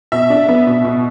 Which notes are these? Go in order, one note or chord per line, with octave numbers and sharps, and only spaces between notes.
B2 E5
D4
B3
B2
B2